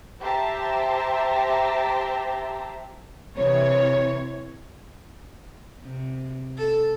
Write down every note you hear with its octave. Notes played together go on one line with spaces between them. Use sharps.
G4 C5 E5 A5 A#5
C3 E3 C#5
C3
A4